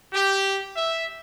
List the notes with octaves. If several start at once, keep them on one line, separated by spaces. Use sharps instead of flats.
G4
E5